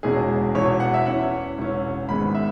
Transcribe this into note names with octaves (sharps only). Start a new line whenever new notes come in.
E1 E2 B2 G#3 C#4 G#4
E1 E2 B2 C#5
F#5
E5
E2 E3 C#4 F#5
E1 E2 E3 C#4
G#1 G#2 G#3 B3 B5
E5